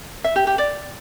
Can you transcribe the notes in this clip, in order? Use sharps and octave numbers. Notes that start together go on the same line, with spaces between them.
E5
G4
G4
D5